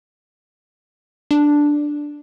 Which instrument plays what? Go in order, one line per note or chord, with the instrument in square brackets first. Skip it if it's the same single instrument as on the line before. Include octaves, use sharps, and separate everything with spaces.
[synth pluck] D4